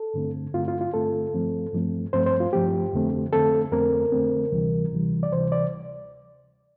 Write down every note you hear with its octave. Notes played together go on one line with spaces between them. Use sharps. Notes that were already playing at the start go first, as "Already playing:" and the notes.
Already playing: A4
G2 D3 A3 C4
G2 D3 A3 C4 F4
F4
F4
G2 D3 A3 C4 A4
G2 F3 A3 C4
G2 F3 A3 C4
G2 F3 A3 C4 C5
C5
F4
G2 F3 A3 C4 G4
F2 D3 A3 C4
F2 D3 A3 C4 A4
F2 D3 A3 C4 A#4
F2 D3 A3 C4
D2 C3 E3 G3
D2 C3 E3 G3
D5
D2 C3 E3 G3 C5
D5